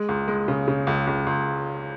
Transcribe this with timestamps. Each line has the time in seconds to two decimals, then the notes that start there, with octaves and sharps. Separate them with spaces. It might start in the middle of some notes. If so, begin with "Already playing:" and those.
Already playing: G#3
0.09 C#2
0.28 G#3
0.48 C#3
0.68 C#3
0.87 C#2
1.07 C#2
1.27 C#2